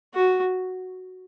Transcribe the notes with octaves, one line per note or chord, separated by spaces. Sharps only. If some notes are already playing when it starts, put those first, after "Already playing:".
F#4